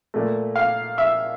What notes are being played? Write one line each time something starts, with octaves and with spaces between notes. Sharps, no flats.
A#2 A3
F5
E5